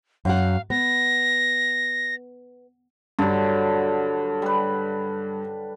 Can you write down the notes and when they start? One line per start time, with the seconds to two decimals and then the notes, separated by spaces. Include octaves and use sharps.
0.25 F#2 F5 F#5
0.70 B3 A#6
3.19 G2 D3 F#3
4.42 G3 B4